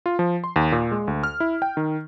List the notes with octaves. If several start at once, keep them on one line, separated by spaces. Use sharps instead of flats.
F4
F3
C6
D#2
A#2
G#3
D2
F6
E4
G5
D#3